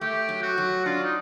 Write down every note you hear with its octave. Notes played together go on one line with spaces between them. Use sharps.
A3 G4
F#3
F#4
F#3
D4 F4
D#4